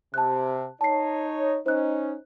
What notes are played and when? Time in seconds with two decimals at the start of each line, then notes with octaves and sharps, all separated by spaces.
0.14 C3 A5 F#6
0.81 D#4 C#5 A5 C7
1.66 C#4 D#4 C5 F#6